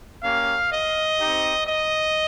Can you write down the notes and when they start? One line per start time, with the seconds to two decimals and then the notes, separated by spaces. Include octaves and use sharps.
0.23 A#3 C#4 G4 F5
0.70 D#5
1.19 C4 D#4 G4
1.67 D#5